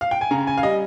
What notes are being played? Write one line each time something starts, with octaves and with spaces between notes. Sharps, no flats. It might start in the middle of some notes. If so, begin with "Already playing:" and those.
F5
G5
G#5
C#3 A#5
G#5
F5
G3 D#5